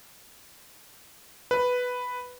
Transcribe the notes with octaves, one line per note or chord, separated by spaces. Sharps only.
B4